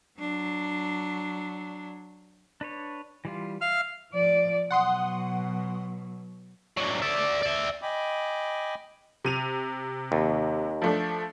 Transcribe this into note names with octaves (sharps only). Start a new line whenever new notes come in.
F#3 D4
D4 B4 C#5
E3 G3 F4
E5 F5 F6
F3 D5
B2 F#3 F#5 C6 D#6
F#3 D4
D5 E5
D5 E5
D#5 G5 G#5 B5 D6
C3 D#7 F7
D#2
F3 A3 D4